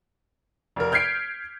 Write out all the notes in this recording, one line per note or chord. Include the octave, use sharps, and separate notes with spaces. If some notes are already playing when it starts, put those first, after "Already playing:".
F1 A#4
F6 G6 G#6 B6 C7 D7